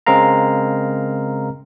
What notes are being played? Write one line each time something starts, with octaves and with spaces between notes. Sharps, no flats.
C#3 G#3 C4 A#4 F5 A#5